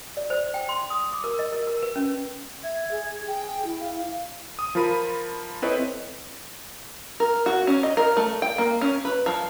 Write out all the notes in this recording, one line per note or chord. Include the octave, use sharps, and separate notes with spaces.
D5
C5
G5
C6
D#6
D6
A#4
D#5
A#4
A#4
B4
C#4
E5 G#6
G#4
G#4 G5
E4
F5
D#6
F3 F4 A#4 B5 D#7
C4 E4 A4 B4 C#5 D#5
A#4
F#4
C#4
D#5
A#4
A3
G5
A#3
C#4
B4
F3